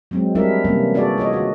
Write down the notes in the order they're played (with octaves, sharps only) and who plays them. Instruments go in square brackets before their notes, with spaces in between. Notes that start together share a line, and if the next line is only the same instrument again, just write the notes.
[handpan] F#3 G#3 C4
G3 C4 D4 E4 A#4 E5
C3 E3 G3 A3 A#3 C#4
D4 F#4 G#4 A4 D5
F4 C#5 D#5
D#3 F#4